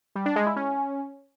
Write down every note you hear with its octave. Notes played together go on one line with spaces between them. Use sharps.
G3
D4
G#3
E4
C#4